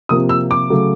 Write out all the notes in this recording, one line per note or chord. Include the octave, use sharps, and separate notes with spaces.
C3 F3 A#3 D#6
E6
D6
C#3 F#3 A3